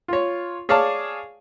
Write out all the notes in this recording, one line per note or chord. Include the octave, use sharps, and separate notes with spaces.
F4 C#5
G#4 C#5 D5 F5 A5